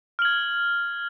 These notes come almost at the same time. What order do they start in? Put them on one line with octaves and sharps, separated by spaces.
F6 F#7 G#6